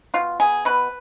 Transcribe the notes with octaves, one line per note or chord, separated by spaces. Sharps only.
B2 F4
B3 G#4
B2 B4